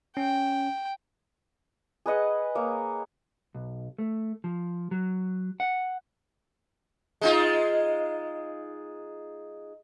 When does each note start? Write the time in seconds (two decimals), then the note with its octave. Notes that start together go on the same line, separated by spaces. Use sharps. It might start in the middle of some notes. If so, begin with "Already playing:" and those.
0.17 C#4 G5
2.06 G#4 B4 D#5 F#5
2.55 A#3 C#5
3.55 B1
3.99 A3
4.44 F3
4.91 F#3
5.60 F#5
7.21 G#3 D#4 F4